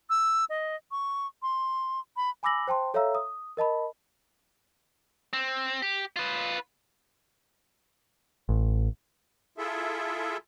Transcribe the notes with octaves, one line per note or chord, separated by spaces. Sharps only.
E6
D#5
C#6
C6
B5
G#5 B5 D6 E6 A#6 F#7
C5 G5 A5 C6
A4 C#5 E5 F5 A#5 E6
D#6
A#4 D#5 A5 B5
C4
G4
F4 B4
A1
E4 F4 G#4 A4 E5